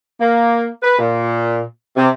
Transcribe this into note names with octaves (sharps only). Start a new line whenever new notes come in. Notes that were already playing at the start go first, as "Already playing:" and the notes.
A#3
B4
A#2
C3